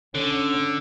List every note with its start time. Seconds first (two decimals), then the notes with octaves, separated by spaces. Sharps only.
0.15 D3 C#4